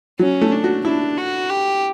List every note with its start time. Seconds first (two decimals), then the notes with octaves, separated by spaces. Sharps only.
0.19 F#3 C#4
0.42 A3
0.52 D4
0.64 F#4
0.85 D4 E4
1.18 F#4
1.50 G4